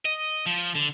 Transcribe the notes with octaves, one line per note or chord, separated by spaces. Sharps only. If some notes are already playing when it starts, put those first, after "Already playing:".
D#5
F3
D3